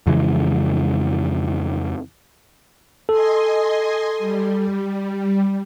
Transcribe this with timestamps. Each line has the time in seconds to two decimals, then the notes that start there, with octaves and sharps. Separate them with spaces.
0.07 F2 C#3 E3 G#3
3.09 A4 D#5 G#5 C6
4.19 G3